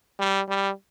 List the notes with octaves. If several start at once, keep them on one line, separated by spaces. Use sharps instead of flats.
G3
G3